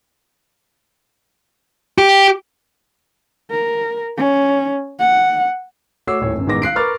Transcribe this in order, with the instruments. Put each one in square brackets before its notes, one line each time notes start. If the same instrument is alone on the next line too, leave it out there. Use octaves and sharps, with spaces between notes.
[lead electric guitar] G4
[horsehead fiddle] A#4
C#4
F#5
[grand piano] A3 F#4 C#5 D6 E6 C7
D#1 A2 C#5
G1 F#2
A1 D#3 G#3 B3 D6 A#6
F5 F#6 C7 D7
A#4 B4 C#6 D6 F6 A6